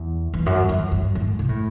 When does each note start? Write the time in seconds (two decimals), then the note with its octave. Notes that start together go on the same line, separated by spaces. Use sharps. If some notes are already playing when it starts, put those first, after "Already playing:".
Already playing: E2
0.34 E2
0.46 F#2
0.69 E2
0.92 F#2
1.15 G#2
1.39 C3
1.49 A2